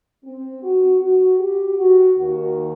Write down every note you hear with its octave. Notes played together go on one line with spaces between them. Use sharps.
C4
F#4
F#4
G4
F#4
D#2 D#3 F#4